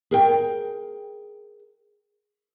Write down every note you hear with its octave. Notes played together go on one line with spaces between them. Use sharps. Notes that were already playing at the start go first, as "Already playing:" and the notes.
G#4 A#4 G5